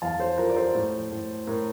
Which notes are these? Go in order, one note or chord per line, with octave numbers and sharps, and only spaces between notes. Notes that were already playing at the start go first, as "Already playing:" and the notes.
E2 F5 A5
A4 C5
F3 A#4
D5
A4 C5
A2
A2
A2 A#4